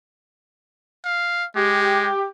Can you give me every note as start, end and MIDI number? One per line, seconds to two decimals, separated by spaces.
1.05 1.45 77
1.56 2.09 56
1.56 2.25 67